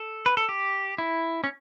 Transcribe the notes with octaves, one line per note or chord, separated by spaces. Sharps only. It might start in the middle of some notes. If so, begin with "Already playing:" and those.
Already playing: A4
B4
A4
G4
E4
C#4